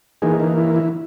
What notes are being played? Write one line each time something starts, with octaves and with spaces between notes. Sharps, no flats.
E3 A#3 D#4 G#4
D#4
E4
E4